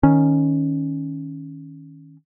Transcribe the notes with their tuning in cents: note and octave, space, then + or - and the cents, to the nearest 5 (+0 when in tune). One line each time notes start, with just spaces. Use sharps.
D#3 +5 C#4 +0